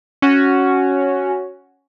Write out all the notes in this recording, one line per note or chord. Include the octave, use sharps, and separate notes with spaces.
C#4 F#4